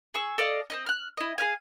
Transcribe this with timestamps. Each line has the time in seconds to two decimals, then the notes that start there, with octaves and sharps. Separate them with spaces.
0.14 G#4 C#6 E6
0.38 A4 D5 D#5 F5
0.70 C4 C#4 D#5
0.86 F6 F#6
1.17 E4 D#5
1.38 G#4 B4 F5 G#5